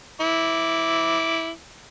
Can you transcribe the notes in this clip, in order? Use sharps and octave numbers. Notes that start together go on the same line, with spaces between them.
E4 D6